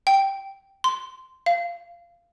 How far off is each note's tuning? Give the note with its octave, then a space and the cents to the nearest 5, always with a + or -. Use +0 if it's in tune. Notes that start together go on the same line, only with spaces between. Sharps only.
G5 -5
C6 -10
F5 -15